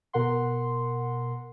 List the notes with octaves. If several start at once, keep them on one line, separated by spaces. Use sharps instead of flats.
B2 A#4 F#5 C6